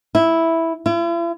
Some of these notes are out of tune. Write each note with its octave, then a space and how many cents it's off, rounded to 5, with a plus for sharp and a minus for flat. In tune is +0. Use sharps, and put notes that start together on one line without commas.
E4 -5
E4 +45